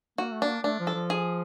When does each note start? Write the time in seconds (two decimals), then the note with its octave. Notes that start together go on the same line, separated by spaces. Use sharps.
0.18 A#3 F#4
0.32 A3
0.42 A#3 D4
0.64 A3 D4
0.80 F3
0.87 A4
0.95 F3
1.10 G#4